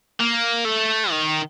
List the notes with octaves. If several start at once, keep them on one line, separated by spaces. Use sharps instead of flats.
A#3
A3
D#3